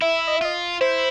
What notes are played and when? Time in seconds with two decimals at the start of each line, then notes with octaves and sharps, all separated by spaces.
0.01 E4 E5
0.27 D#5
0.36 E5
0.41 F4 D#5
0.81 E4 C5